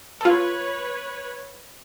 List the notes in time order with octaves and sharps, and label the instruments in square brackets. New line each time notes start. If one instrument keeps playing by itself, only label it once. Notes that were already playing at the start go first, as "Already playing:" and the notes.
[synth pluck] F4 A4 [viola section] B4 C#5